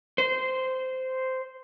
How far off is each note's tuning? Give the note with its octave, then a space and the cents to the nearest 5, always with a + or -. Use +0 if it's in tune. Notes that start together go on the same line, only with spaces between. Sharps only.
C5 -10